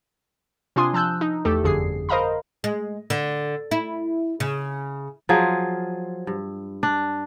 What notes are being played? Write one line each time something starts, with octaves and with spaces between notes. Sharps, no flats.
C3 D4 F4 G#5 C6 D#6
F3 A5 E6 F#6 G6
D#4
E2 A3 G4 A4
G1 F2 D3 G#4 C7
A#4 C5 D#5 F5 A#5 B5
G#3
D3
E4
C#3
F3 F#3 F4 G#4
G2
D4